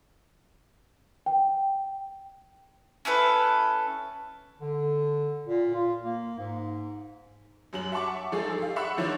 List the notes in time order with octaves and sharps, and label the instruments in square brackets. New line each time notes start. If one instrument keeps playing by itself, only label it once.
[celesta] G5
[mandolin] C#4 E4 A4 B4
[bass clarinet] D3
A#2
F4
A#3
G#2
[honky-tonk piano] F#2 F#3 G3 F#7
E5 F#5 A5 C#6 D6
F3 G#3 D#4 G#4 A4
G4 F5
E5 F#5 B5 C#6 E6 F#6
D#3 F3 D4 D#4 C#5